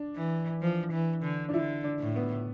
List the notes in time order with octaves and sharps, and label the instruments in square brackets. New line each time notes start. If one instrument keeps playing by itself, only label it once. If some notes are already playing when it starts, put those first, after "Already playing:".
Already playing: [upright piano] D4
[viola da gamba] E3
F3
E3
D3
[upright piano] D4
[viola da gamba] D3 [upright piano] E4
[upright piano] D4
[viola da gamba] A2
[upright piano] B3